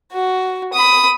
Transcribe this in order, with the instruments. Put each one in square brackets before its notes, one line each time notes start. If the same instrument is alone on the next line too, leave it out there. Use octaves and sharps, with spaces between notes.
[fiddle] F#4
B5 D#6